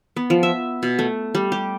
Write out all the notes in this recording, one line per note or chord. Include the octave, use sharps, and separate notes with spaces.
B3
F3
E5
B2
A3
G3
G4